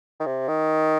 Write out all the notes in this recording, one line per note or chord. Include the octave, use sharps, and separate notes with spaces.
D#3
C3
D#3